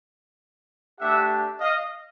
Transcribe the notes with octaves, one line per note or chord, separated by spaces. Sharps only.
A3 D4 G4 E5 F#5
D#5 F5